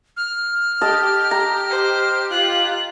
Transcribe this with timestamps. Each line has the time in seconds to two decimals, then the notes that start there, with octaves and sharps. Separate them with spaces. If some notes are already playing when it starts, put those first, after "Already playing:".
0.17 F6
0.81 G4 D#5 A5
1.31 A#5
1.70 C5
2.31 F4 F5 F#6